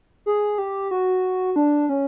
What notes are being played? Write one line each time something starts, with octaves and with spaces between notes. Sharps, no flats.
G#4
G4
F#4
D4
C#4